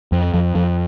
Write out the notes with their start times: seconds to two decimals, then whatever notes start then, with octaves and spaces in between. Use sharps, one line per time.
0.12 F2
0.34 F2
0.55 F2